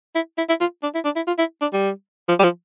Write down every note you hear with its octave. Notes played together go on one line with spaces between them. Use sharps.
E4
E4
E4
F4
D4
E4
D4
E4
F4
E4
D4
G3
F3
G3
F3